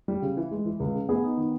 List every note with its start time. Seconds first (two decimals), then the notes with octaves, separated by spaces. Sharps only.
0.08 G3
0.22 C#3
0.37 E3
0.51 G#3
0.65 E3
0.80 C#2
0.94 C#3
1.09 B3 G#4
1.23 D#4
1.37 D#3